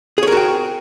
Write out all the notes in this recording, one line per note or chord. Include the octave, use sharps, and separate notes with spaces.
F#4 G#4 A#4 C#5 G5